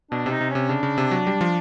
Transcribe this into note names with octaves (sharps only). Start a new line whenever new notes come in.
B2 D4
C3
D#4
C3
C#4
C3
C#3 D4
C#3
C3
F#3
G3
F3